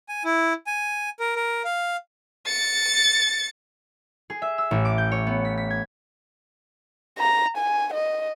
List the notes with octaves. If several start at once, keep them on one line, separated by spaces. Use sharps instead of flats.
G#5
E4
G#5
A#4
A#4
F5
A6 C#7
G#4
E5
E6
A1
D6
G6
C#5
B3
B6
B6
G#6
A#5
G#5
D#5